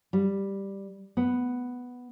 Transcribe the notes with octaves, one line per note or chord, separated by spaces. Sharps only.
G3
B3